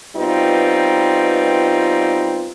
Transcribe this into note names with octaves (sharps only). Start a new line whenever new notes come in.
B2 G3 C4 D#4 F4 B4